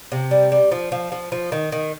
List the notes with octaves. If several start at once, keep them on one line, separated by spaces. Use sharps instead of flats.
C3
G3
G3
F3
F3
F3
F3
D#3
D#3